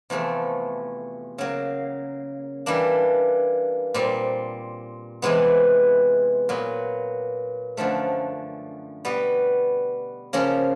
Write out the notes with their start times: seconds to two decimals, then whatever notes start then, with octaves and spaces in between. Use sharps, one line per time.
0.10 E2 C3 F3 A3
1.38 C#3 F#3 A#3
2.66 E3 G3 A#3 D4
3.94 A#2 G3 C4
5.22 E2 C3 E3 G#3 B3
6.49 A#2 F#3 B3
7.77 F#2 D3 F3 A3
9.05 B2 G3 B3
10.33 C#3 F3 A#3 C#4